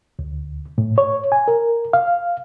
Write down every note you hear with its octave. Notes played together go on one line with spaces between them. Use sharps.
D2
A2
C#5
G#5
A#4
F5